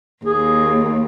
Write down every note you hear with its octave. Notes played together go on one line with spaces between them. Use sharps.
D#2 G#4